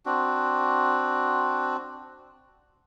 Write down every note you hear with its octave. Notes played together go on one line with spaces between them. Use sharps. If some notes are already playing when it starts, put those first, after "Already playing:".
C4 D4 F#4